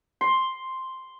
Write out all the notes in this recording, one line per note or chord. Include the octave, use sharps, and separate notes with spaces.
C6